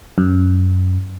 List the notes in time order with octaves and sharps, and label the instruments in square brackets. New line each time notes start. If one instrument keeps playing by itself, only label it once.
[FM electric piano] F#2